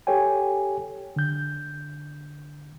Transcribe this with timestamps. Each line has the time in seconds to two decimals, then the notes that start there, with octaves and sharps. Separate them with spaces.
0.07 G4 A4 C#5 G5 G#5
1.16 D3 G6